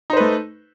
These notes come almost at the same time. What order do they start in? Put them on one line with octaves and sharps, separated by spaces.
D#4 C5 B4 A3